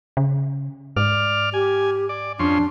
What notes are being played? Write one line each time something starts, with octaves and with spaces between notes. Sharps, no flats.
C#3
G#2 D5 F6
G4 G#5
D5
F2 C#4 D4 C6